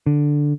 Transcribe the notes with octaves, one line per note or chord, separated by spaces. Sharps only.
D3